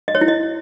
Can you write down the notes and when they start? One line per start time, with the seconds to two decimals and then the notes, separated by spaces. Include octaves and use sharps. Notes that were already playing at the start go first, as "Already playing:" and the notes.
0.08 D#5
0.15 C#5
0.21 E4
0.28 D#5